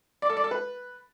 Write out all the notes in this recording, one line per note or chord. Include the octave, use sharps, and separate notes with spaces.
D5
A4
D5
A4
B4